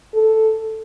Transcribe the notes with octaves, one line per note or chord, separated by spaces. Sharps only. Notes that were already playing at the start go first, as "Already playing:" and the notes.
A4